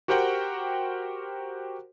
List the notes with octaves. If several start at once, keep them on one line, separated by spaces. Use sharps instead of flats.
F#4 G4 A#4 C5 F#5 G5